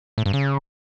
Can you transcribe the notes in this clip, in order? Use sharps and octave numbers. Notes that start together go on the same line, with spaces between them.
A2
G2
C#3